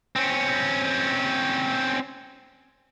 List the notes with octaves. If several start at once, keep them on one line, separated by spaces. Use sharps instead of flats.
C4 C#4